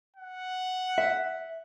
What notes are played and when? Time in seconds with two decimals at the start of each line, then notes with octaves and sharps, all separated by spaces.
0.16 F#5
0.98 E5